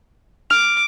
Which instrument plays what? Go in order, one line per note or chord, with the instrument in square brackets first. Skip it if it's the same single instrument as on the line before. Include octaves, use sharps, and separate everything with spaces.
[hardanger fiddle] D6 [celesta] F6 F7